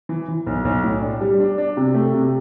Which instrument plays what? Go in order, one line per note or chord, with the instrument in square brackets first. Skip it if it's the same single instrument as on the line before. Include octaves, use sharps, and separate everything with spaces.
[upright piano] E3
E3
B1
B1
A2
D4
G3
D4
D4
C3
A3
C3